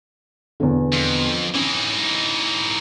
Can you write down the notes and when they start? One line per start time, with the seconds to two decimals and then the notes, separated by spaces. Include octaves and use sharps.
0.60 E2 B2 D3
0.93 F2
1.54 E3 C#4 D#4